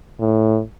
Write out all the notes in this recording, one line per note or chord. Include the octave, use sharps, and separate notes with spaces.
A2